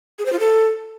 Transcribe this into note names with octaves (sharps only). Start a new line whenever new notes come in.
G#4
C5
F4
A4